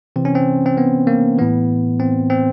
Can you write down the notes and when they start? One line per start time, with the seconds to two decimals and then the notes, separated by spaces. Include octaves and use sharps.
0.16 C3 E3 C4
0.25 C#4
0.35 C4
0.66 C4
0.77 B3
1.07 A#3
1.38 A2 E3 B3
2.00 C4
2.30 C4